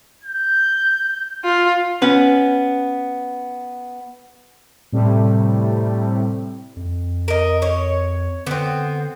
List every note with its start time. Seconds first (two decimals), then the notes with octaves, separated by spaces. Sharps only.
0.23 G6
1.44 F4
2.02 B3 C#4 B4
4.92 A2 C3 G3 A3
6.77 F2
7.28 A#4 D#5
7.62 C#5
8.46 D3 B3 C4